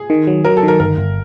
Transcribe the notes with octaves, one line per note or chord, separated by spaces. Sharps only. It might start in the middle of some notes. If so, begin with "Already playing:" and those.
Already playing: G#4
D#3
F#3
F#3 A#4
A4
D#3
A#4
G1 A#4
G1